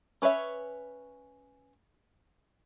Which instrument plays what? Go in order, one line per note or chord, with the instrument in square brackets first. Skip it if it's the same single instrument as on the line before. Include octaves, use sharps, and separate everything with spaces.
[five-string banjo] C#4 B4 C#5 E5